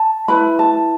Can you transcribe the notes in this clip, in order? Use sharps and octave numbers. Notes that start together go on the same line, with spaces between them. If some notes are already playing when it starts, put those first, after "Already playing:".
Already playing: A5
E4 B4 B5
A5